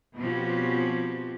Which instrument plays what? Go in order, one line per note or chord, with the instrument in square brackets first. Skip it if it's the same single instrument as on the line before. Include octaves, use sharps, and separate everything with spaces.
[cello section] B2 F3 C4 C#4 F#4 G4